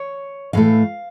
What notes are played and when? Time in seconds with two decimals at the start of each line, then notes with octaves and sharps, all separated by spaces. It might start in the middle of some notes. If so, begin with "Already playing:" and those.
Already playing: C#5
0.53 A2 E3 A3 F5